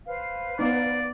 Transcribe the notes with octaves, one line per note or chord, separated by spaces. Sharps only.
B4 C5 F5
B3 D#4 D5